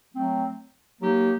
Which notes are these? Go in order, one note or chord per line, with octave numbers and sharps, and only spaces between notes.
F#3 A3 C4
F#3 A#3 D#4 G4